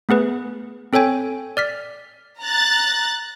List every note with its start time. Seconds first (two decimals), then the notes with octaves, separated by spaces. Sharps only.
0.09 A3 B3 G#4 B4
0.93 C4 A4 C#5 G5 G#5
1.57 D5 F6 B6
2.42 A#5 F#6 A6